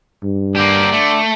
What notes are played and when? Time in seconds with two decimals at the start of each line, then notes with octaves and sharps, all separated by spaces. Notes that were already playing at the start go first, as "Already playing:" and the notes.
0.23 G2
0.56 D3 A#3 G4 D5
0.92 A3